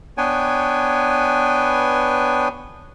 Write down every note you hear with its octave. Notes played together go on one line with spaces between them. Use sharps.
B3 D4 B4 C#5 G5 G#5